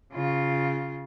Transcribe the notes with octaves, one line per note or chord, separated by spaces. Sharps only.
C#3 F4